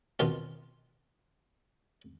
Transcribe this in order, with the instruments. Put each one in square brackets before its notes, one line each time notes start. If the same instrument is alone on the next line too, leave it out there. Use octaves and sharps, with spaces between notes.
[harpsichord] B2 D#3 C4 F4